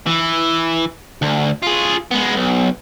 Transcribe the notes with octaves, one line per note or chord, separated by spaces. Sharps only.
E3
D2
F4 G#4
G#3 B3
B1